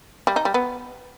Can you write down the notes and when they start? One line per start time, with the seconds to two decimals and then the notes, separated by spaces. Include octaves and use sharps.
0.27 G3
0.36 D#4
0.45 G3
0.54 B3